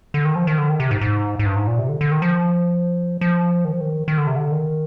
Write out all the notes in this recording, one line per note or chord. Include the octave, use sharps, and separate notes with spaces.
D3
D#3
F3
D#3
D3
D#3
C3
G#2
G#2
G#2
G2
G#2
A#2
C3
D3
D3
D#3
F3
F3
D#3
F3
D#3
D#3
D3
C3
D3
D#3